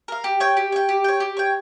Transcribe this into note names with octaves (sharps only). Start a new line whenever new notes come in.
A#4 F5
G4
C#5 G5
G4
C#5 G5
G4
C#5 G5
G4
C#5 G5